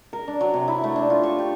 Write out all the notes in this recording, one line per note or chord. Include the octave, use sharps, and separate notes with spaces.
A#4
D4
F#3
C3
E4
A3
D4
F4
C#6
G4